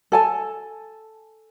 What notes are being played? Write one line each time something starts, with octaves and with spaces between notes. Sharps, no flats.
A4 G#5 A5